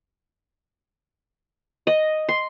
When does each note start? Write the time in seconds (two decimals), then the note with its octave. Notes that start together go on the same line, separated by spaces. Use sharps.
1.87 D#5
2.29 C6